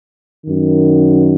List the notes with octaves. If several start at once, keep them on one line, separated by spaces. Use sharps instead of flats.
F#2 D#3